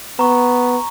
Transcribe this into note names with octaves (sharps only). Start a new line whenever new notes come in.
B3 A#5 C#6